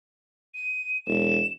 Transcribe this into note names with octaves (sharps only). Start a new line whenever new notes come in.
D#7
E1 E7